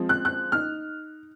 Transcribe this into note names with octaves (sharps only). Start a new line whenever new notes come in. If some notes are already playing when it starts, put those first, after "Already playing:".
Already playing: F3 G#3 C4
F#6
F#6
D#4 F6